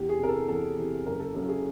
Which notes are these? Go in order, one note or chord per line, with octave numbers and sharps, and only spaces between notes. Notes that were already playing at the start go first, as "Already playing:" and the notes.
Already playing: E2 G4
G#4
C3 E3 A#4
A4
E2 A4
C3 E3
F#1 A#4
A4
F#2 C#3 F#3 A4
G#4